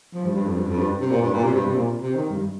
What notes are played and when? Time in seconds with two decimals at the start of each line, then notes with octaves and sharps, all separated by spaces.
0.14 F3
0.25 G2
0.35 G2
0.46 F2
0.57 G2
0.68 F2
0.79 G2
1.00 C3
1.11 A#2
1.22 G2
1.33 A#2
1.43 C3
1.54 G2
1.65 C3
1.76 A#2
2.01 C3
2.15 D#3
2.30 G2